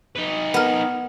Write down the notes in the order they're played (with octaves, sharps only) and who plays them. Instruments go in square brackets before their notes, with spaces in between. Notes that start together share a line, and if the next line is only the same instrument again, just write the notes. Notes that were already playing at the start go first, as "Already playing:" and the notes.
[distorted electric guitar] D#4 B4
[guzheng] B3 A#4